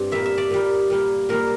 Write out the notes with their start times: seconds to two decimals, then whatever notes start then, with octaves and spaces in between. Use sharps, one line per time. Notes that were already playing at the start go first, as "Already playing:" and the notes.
Already playing: G2 C4 D5
0.11 A#2 G3 A#3 E5
0.26 E5
0.38 D5
0.51 A#2 G3 A#3
0.90 A#2 G3 A#3
1.29 A#2 G3 A#3 A#4